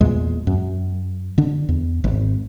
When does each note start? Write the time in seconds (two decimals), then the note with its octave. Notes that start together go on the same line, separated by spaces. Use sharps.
0.01 E2 A#2 G#3
0.47 F#2
1.38 D3 D4
1.69 E2
2.04 G#1